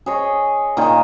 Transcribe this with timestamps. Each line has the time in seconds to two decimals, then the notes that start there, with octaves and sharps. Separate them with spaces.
0.06 G#4 C#5 D#5
0.77 A#2 D#3